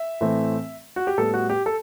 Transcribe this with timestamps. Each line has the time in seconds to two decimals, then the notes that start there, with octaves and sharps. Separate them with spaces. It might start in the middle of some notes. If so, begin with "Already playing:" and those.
Already playing: E5
0.21 A2 E3 A3 C4
0.96 F#4
1.07 G4
1.18 A2 G3 B3 A4
1.34 F#4
1.50 G4
1.66 A4